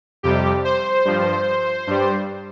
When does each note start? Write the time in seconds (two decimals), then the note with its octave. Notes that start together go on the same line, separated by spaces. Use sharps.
0.23 F2 C3 G3 G4
0.65 C5
1.05 G2 F3
1.87 G2 G3